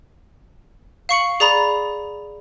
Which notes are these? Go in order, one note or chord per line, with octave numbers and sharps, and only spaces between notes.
F5 C#6 C#7 F#7
G#4 D5 A#5 B5 F7